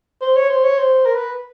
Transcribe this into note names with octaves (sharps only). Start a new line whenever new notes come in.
C5
C#5
C5
C#5
C5
A#4
B4